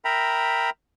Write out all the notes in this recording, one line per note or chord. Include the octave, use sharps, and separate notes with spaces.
A#4 E5 G5 A#5 B5